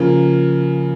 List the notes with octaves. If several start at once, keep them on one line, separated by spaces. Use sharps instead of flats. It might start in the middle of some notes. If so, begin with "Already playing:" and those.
Already playing: C#3 F3 A#3